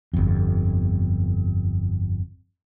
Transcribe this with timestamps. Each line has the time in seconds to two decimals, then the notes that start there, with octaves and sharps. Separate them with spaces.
0.14 G1 F2